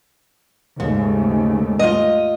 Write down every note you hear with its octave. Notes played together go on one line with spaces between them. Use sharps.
D#2 G#2 C#3 A3
F4 D#5